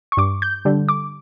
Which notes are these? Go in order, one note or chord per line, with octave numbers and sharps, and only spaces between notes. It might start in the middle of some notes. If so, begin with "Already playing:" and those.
C#6
G2 D6
G6
D3 G3
D6